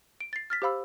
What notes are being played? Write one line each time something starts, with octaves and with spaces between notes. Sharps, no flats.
D7
A6 C7
F6 A6 B6
G4 C5 F5 B5 E6